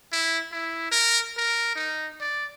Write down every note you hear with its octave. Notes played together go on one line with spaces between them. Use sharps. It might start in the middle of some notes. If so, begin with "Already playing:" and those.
E4
E4
A#4
A#4
D#4
D5